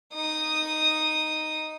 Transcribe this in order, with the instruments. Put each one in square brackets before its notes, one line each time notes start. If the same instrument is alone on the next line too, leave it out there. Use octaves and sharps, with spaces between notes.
[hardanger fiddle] D#4 D#6